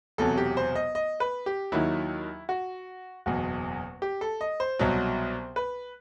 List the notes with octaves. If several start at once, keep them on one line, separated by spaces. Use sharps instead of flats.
E1 E2 C3 F#3 A4
G4
C5
D#5
D#5
B4
G4
D#2 D#3 F#3 E4
F#4
F#1 E2 B2 F#4
G4
A4
D#5
C5
C2 B2 F#3
B4